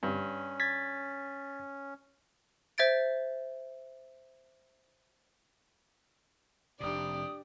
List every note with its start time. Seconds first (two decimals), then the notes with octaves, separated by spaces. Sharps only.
0.03 G2 C#4
0.60 G#6 A6 B6
2.78 C5 E5 G#6 A6 D7
6.80 F1 C3 D4 G4 D5 D#6